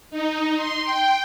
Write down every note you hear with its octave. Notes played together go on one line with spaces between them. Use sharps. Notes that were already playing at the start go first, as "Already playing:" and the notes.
D#4
C6
G5